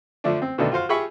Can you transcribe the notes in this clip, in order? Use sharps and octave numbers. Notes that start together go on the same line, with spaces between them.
D3 F3 A3 D4
C4
B2 D3 D#3 A3 D4 A4
F4 F#4 C5 F5
F4 G4 G#4 E5 B5 C#6